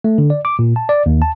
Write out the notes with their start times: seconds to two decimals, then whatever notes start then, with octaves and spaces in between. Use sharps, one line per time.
0.04 A3
0.18 D3
0.30 D5
0.45 D6
0.59 A#2
0.76 A5
0.89 D5
1.06 D#2
1.22 A5